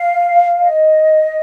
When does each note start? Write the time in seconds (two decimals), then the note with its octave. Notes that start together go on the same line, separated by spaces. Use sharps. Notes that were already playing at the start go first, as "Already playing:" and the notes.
Already playing: F5
0.61 D#5